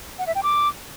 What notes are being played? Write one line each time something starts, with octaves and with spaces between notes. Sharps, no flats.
F#5
E5
G5
D6